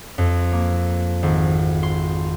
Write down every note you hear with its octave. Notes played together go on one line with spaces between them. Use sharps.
F2
A#3
G#1
C6